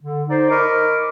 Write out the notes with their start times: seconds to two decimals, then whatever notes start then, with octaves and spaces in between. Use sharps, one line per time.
0.01 D3
0.29 D#4 C5 D5
0.50 A#4 D#5 B5 C#6 D6